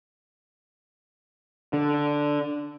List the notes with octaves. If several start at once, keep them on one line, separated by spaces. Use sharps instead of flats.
D3